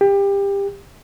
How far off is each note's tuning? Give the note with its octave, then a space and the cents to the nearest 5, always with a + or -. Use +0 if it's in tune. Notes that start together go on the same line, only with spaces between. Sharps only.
G4 +25